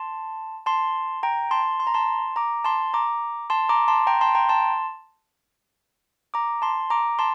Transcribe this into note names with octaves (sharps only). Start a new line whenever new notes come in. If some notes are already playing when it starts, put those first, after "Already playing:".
Already playing: A5 C6
A5 C6
G5 A#5
A5 C6
C6
A#5
A5 C6
A#5 D6
A5 C6
A#5 D6
A5 C6
A#5 D6
A5 C6
G5 A#5
A5 C6
G5 A#5
A5 C6
A#5 D6
A5 C6
A#5 D6
A5 C6